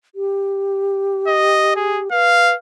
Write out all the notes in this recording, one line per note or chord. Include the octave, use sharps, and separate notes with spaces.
G4
D#5
G#4
B4 F5